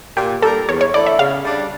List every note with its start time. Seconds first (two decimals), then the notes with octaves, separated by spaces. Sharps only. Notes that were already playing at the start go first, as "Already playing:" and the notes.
0.17 A#2 G4
0.42 G3 D4 G4 A4 A#4
0.68 E2 C#5
0.81 C#5
0.94 D3 A3 E4 A4 D5
1.06 E5
1.19 C#3 F5
1.45 G3 D4